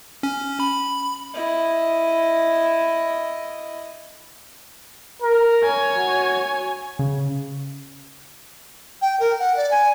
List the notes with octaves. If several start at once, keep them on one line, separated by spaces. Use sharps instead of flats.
C#4
B5
E4 D#5
A#4
C#5 G#5
F#4
C#3
G5
A#4
F#5
D5
G#5